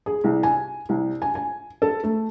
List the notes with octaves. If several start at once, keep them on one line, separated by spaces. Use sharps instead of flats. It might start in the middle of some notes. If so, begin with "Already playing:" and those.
G#4
C2
G#5
C2
G#5
G#5
A4
A3